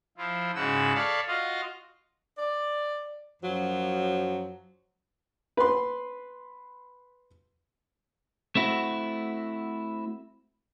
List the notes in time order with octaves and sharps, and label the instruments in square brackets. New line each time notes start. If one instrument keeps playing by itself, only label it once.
[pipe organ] F3 E4 F4
G#2 C#3 E4 F#4 F#5 E6
A4 C#5 D5 F5 A5 B5
F4 F#4 D#5 F5
[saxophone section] D5
F#2 F3 F#3
[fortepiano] B4 C6
[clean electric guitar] A3 C4 E4 F#4